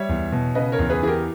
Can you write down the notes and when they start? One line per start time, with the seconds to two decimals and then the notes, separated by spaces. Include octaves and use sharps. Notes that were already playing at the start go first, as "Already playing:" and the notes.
Already playing: G3 C#5 E5
0.09 E2
0.32 B2
0.55 C#3 B4 D#5
0.72 A#4 C#5
0.79 E2
0.90 G#4 B4
1.02 E3 G#4
1.07 G4 A#4